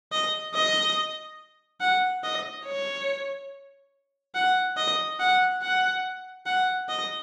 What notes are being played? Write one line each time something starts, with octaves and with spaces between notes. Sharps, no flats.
D#5
D#5
F#5
D#5
C#5
F#5
D#5
F#5
F#5
F#5
D#5